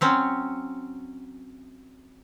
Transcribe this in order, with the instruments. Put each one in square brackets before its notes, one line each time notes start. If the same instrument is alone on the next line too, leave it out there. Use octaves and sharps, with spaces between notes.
[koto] F#3 C4 C#4